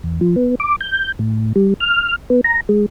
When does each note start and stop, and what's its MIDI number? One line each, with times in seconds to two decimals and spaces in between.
0.03 0.20 40
0.21 0.36 53
0.36 0.55 59
0.60 0.76 86
0.81 1.12 91
1.19 1.52 45
1.56 1.74 55
1.80 2.16 89
2.30 2.41 59
2.44 2.61 82
2.69 2.86 56